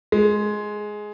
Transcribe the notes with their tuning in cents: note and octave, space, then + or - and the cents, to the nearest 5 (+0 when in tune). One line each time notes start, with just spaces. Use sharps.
G#3 +10